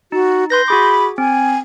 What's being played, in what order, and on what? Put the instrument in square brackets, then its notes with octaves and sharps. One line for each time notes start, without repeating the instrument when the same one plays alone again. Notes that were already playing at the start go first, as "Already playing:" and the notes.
[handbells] D#4 [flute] F#4
[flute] B4 [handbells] C6 G6 A#6
[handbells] F#4 G#4 D6 [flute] B5
[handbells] C4 [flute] G#5